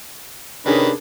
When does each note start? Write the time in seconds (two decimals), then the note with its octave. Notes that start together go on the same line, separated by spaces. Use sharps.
0.66 C3 D#3 C#4 D4 G#4 A#4 B4